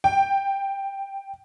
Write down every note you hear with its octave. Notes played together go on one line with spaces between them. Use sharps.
G5